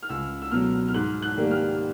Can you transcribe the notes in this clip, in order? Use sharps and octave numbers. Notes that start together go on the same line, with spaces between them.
F6
C#2 E6
E6
B2 F#3 F6
F6
G#2 F#6
F#6
D#3 G3 A#3
F6